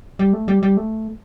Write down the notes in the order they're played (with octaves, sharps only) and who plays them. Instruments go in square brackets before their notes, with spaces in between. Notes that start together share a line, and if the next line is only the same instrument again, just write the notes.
[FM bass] G3
A3
G3
G3
A3